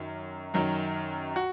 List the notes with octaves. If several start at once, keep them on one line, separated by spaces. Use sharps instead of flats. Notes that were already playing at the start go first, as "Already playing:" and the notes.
Already playing: F#2 D#3 F#3
F#2 D#3 F#3
F#4